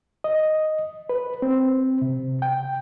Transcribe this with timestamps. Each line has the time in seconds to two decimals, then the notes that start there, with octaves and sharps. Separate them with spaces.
0.24 D#5
1.09 B4
1.42 C4
2.02 C3
2.42 G5